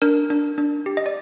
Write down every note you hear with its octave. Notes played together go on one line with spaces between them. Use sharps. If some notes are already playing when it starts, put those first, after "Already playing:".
D4 A#4
D4
D4
G4
D#5
D5